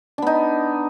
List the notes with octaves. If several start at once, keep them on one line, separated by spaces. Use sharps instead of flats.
B3 D4 D#4